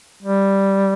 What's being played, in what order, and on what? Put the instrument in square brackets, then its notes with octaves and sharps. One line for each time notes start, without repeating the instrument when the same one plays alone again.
[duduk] G3